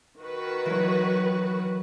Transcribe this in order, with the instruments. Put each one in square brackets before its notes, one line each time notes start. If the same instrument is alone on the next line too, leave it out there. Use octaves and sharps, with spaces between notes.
[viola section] D#3 F#4 B4
[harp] E3 F#3